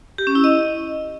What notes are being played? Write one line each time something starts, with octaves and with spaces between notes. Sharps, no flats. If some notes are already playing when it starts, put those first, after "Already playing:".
G4
C#4
E4
D#5